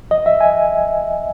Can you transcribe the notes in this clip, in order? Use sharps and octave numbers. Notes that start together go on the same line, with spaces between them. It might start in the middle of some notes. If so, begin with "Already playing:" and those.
D#5
E5
G#5